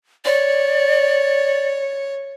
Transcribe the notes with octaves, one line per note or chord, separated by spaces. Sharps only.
C#5 D5